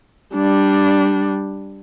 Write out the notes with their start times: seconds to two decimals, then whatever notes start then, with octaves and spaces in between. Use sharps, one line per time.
0.34 G3 D4